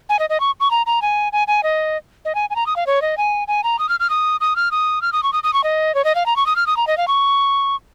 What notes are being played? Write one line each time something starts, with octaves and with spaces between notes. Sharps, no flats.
G#5
D#5
D#5
C#6
C#6
A#5
A#5
G#5
G#5
G#5
D#5
D#5
G#5
G#5
A#5
D#6
F5
C#5
D#5
G#5
G#5
A#5
D#6
F6
F6
D#6
D#6
F6
D#6
F6
D#6
C#6
D#6
D#6
C#6
D#5
C#5
D#5
F5
A#5
C#6
D#6
F6
D#6
A#5
D#5
F5
C#6